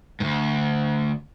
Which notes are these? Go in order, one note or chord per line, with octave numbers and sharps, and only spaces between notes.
D2 G#2